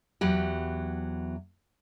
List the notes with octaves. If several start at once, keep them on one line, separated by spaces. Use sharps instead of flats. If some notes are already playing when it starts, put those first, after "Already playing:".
E2 F#3 G4